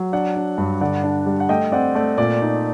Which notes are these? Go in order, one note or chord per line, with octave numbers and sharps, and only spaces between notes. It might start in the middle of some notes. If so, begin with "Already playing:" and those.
Already playing: F#3
D4 D5 F#5
D4
G2
D3 D5 F#5
D4
G3
F#5
A3 D#5 G5
C4 D5 F#5
A3 D5
A#2 D5
D#4